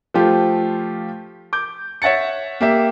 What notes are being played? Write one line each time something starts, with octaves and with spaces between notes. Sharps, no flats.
F3 A3 F4 G4
D6 G6
C#5 E5 F#5 A6 C#7
A#3 G4 E5